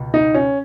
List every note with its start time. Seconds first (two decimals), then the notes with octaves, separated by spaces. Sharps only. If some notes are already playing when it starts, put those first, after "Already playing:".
Already playing: C#2 B2
0.14 D#4
0.35 C#4